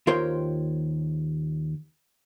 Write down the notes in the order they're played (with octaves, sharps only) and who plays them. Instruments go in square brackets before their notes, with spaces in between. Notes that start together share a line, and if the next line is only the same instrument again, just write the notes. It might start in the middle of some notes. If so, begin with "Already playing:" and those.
[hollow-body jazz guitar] D#2 F4 A#4 C5 C#5 G5